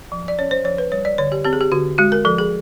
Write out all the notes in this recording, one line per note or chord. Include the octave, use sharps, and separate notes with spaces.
F3
D5
C#4 C#5
C5
F3 C#5
B4
G3 C#5
D5
D3 C#5
G4
C4 G4
G#4
G4
D3 F#4
G#3 F#4
A#4
F3 A4
G#4